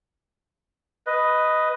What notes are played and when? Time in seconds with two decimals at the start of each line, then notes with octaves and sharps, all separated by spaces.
1.07 B4 D#5